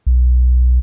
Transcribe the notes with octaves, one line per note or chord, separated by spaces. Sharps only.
B1